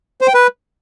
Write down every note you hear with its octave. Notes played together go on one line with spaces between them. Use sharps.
C5
G5
B4